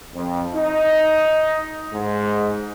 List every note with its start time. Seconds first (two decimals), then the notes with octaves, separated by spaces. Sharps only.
0.15 F2
0.55 D#4
1.93 G#2